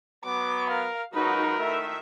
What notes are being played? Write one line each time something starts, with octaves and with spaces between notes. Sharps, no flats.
F#3 B3 D6
A#4 F5
C#2 F#3 D#4 F#4 A#4 B4
A2 D#3 A3 E5